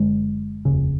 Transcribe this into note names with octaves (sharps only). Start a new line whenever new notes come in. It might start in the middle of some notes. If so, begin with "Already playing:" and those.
Already playing: F#1 F#2 D3 G#3
F1 D#2 C#3